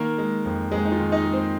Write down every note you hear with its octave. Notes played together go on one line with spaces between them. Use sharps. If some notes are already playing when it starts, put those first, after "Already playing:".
Already playing: D#3 A#3 A#4
G#3
F2
F2 G#3 G#4
D#4
F4
D#3
D#4 D#5
G#3
C4 C5